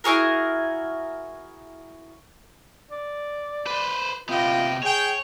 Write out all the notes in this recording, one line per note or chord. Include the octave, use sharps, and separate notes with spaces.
E4 F#4 G#4 A#4
D5
B4 C5
C3 B3 F4 D#5 G5
G#4 C#5 G5